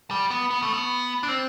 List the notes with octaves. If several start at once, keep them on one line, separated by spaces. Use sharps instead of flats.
G3
B3
B3
A3
B3
D4
C4